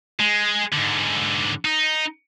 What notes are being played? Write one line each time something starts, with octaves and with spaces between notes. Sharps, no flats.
G#3
G#2 D3
D#4